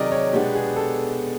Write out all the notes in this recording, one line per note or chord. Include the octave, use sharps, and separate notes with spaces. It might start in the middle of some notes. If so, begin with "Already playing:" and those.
Already playing: C3 D#3 F#3 G#4 A#4 D5 D#5
C#5
B2 G#3 B3 D4 G4
G#4
A4